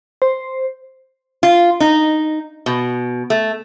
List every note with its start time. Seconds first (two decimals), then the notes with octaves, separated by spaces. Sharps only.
0.22 C5
1.43 F4
1.80 D#4
2.66 B2
3.30 A3